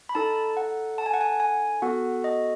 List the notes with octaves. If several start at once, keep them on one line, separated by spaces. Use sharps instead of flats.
B5
D#4 A4 A5
F#5
A5
G#5
F#5
G#5
G#5
B3 F#4 A4 F#5
D#5